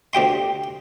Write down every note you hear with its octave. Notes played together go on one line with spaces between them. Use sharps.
D2 G4 G5 C6